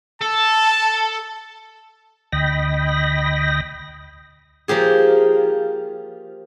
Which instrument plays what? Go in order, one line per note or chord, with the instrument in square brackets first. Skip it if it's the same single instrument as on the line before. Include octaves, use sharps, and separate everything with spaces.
[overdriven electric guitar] A4 [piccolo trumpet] A5
[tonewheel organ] D2 D#5 G5 B5 A#6
[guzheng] F3 A#3 G4 G#4